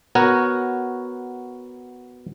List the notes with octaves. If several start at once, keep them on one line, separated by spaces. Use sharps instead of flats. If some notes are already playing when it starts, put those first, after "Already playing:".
B3 F#4 A#4 C#5